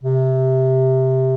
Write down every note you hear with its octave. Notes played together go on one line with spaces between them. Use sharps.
C3